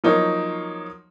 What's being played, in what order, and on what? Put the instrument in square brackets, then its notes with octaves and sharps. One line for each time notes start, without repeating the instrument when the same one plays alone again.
[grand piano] F3 F#3 A#3 D#4 C#5